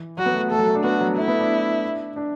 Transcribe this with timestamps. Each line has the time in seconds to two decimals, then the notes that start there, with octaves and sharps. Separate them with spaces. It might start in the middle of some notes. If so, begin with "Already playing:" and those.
Already playing: E3
0.18 F#3 F#4
0.26 B3
0.34 A3
0.51 A3 A4
0.59 F#3
0.68 A3
0.75 D4
0.84 B3 F#4
1.01 F#3
1.17 A3 E4
1.28 B3
1.39 D4
2.16 D4